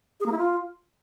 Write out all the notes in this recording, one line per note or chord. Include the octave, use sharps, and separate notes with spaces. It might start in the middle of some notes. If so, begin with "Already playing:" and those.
G#4
A#3
E4
F4